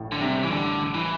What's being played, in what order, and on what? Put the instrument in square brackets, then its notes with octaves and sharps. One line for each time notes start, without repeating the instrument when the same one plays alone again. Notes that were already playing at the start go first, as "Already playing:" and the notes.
Already playing: [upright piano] A1 A2
[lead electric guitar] D3
[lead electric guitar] C3 [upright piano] G3
[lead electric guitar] E3
[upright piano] A1 [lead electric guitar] D3
[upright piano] A1
[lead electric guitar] E3